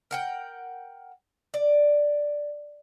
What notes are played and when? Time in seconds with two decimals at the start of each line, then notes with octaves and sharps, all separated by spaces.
0.11 A#4 F#5 G5
1.54 D5